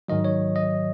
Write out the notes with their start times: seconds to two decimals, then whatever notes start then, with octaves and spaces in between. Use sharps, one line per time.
0.08 G#2 D#3 F#3 D#5
0.25 C#5
0.56 D#5